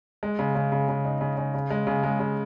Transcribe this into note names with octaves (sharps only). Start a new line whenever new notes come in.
G#3
C#3
C#3
C#3
C#3
D#4
C#3
C#3
C#3
G#3
C#3
G#3
C#3